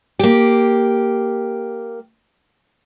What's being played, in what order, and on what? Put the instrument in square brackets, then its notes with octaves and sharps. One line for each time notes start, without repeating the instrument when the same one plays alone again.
[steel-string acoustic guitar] A#3 G4